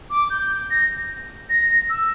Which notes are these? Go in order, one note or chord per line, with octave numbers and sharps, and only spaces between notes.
D6
G6
A#6
A#6
E6